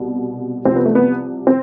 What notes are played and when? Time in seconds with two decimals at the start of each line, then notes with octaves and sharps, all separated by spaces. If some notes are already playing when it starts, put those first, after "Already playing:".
Already playing: C2 B2
0.65 C2 C3 F3 C4
0.76 B3
0.86 A3
0.95 B3
1.47 C4